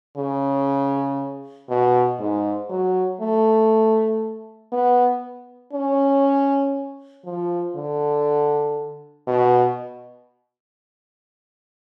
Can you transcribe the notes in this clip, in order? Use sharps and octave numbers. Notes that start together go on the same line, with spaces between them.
C#3
B2
G#2
F#3
A3
B3
C#4
F3
D3
B2